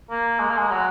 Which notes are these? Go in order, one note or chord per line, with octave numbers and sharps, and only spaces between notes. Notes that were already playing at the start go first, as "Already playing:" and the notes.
A#3
G#3
A#3
G#3
F#3